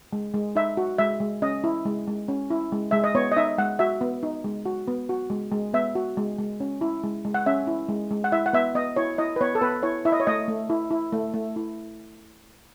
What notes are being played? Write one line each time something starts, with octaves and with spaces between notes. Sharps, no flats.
G#3
G#3
D#4 E5
F#4
G#3 E5
G#3
C#4 D#5
E4
G#3
G#3
C#4
E4
G#3
G#3 E5
D#5
B3 C#5
D#5
D#4 E5
G#3 F#5
F#4 E5
B3
D#4
G#3
F#4
B3
F#4
G#3
G#3
B3 E5
F#4
G#3
G#3
C#4
E4
G#3
G#3
F#5
C#4 E5
E4
G#3
G#3
F#5
E4 E5
F#5
B3 E5
B3 D#5
E4 C#5
E4 D#5
B4
B3 C#5
A4
B3 B4
E4 C#5
E4 E5
D#5
C#5
A3 D#5
A3
E4
E4
A3
A3
E4